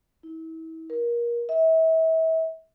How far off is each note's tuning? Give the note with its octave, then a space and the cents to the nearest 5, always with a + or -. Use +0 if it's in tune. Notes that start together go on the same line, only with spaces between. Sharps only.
E4 -35
A#4 +25
E5 -35